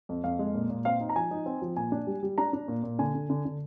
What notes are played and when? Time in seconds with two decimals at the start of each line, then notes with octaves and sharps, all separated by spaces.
0.09 F2
0.24 F2 F5
0.39 G#3
0.54 A#2
0.70 A#2
0.85 C4 F5
1.00 D#4
1.09 A#5
1.16 F3 G#5
1.31 D#4
1.46 C4
1.62 F3
1.77 A#2 G#5
1.92 D4
2.07 G3
2.23 G3
2.38 D4 A#5
2.53 D4
2.68 A#2
2.83 A#2
2.99 D3 G#5
3.14 D3
3.30 D3
3.45 D3